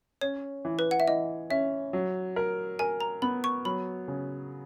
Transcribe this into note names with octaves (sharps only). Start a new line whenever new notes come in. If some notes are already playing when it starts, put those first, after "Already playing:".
C#4 C#5
E3
B4
F#5
E5
E3 D#5
C#4 E5
F#3
A#4
A#4 G#5
A#5
B3 B5
C#6
F#3 B5
C#3